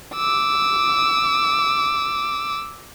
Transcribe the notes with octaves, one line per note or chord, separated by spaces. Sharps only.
D6 E6